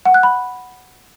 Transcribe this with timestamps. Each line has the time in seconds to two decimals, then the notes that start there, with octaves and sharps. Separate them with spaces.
0.05 F#5
0.14 F#6
0.23 B5